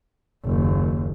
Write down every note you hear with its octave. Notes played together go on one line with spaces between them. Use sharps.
F#1 D#2